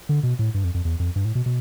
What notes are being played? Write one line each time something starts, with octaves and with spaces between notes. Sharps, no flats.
D3
B2
A2
G2
F2
F2
E2
F2
G2
A2
B2
B2